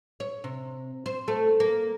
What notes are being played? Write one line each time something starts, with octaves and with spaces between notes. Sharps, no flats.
C#5
C3
C5
A3
A#3